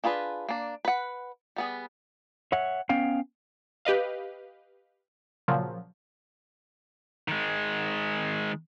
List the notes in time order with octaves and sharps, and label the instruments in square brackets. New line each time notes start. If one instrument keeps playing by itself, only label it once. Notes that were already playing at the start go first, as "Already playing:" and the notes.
[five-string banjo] D4 F4 G#4 B4
A#3 D4
B4 F#5
G3 B3 G#4
[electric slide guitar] C#5 E5 F#5
B3 C#4 F5 G5
[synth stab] G4 B4 D#5 F5
A#2 C#3 F3 F#3
[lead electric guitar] D#3 G#3